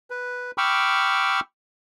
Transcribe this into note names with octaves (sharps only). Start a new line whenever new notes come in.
B4
G5 B5 C#6 D6 E6 F6